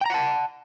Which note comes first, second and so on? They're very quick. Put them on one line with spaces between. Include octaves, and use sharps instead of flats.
G5 A#5 F#5 A5